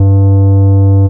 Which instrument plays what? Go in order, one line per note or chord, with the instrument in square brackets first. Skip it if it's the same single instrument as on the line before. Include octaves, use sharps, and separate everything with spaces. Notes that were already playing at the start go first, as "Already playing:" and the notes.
Already playing: [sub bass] G2